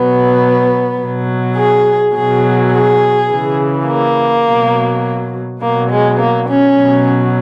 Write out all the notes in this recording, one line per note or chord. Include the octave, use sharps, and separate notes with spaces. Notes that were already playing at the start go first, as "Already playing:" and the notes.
Already playing: B2 F#3 B3
B2 F#3
G#4
B2 F#3 G#4
G#4
C#3 E3
A#3
B2 F#3
B2 F#3 A#3
G#3
A#3
C#4
B2 F#3